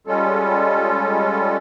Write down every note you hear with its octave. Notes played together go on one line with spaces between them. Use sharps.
G3 G#3 C#4 F4 A4